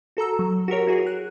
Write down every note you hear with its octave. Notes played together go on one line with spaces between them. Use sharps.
F#4 A4 A#5 E6
F#3
F#4 G4 A#4 C#5
E4 F#4 G#4
F#6